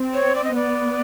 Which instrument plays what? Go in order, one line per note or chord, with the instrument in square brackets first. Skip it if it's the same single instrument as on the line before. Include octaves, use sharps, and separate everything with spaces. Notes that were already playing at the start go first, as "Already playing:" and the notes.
Already playing: [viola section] C4
[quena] C#5
D5
D#5
[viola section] B3 [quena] D5